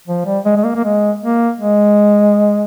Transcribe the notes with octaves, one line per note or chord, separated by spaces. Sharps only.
F3
G3
G#3
G#3
A#3
A#3
G#3
A#3
G#3